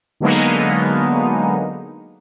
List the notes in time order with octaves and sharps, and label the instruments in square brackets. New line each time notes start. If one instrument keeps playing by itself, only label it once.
[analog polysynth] D3 F#3 G#3 A#3 B3 D#4